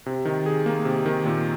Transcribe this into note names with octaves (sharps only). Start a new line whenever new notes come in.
C3
D#3
G#4
A#3
C3
D#3
A#2